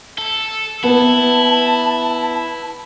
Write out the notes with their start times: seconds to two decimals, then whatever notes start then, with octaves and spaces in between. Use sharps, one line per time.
0.18 A4
0.84 B3 E4 A5